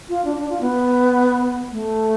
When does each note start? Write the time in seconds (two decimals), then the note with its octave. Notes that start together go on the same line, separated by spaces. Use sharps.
0.09 F4
0.25 D4
0.37 D4
0.50 F4
0.61 B3
1.72 A3